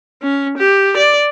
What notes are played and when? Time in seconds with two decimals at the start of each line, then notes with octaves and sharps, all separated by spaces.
0.23 C#4
0.58 G4
0.97 D5